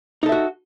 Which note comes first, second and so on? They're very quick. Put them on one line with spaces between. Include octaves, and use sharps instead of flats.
D#4 A4 E5 F#4